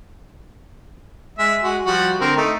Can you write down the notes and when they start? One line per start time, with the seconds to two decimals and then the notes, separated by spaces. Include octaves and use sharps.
1.39 G#3 E5
1.63 G#3 F#4
1.86 F3 G3 F#4
2.20 D3 C4 A#4
2.37 A3 D#4